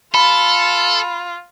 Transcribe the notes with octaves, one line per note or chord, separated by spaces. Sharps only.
F4 A4 B5